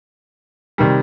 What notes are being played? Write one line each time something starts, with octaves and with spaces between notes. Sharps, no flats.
C3 D#3 G3